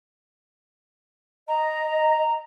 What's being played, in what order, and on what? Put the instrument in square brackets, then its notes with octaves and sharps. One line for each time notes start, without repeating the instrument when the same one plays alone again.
[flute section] D#5 [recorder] A#5